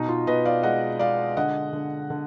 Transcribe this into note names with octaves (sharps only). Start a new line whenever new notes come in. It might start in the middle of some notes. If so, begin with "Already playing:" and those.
Already playing: B2 D#4
F4
B2 B4 D#5
D5 F5
G#3 D#5 F#5
G#3 D5 F5
D3 D#5 F#5
D3
D3